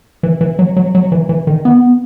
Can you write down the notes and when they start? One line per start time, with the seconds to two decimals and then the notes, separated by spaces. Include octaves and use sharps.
0.23 E3
0.41 E3
0.59 F#3
0.76 F#3
0.95 F#3
1.12 E3
1.29 E3
1.47 D#3
1.65 B3